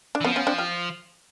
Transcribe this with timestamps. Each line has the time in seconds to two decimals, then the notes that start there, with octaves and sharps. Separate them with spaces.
0.15 D4
0.21 E3
0.25 F3 B3 C#4
0.36 B3 C#4
0.47 C4 D4
0.58 F4 G4